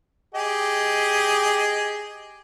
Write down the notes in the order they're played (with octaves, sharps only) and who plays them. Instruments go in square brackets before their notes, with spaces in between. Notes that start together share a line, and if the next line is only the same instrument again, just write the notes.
[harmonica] G4 G#4 D#5